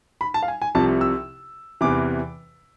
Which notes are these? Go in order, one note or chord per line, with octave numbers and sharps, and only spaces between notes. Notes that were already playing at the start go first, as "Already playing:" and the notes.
B5
A5
F5
G#5
G#5
C2 C3 F3 A5
E6
E2 C3 E3 D6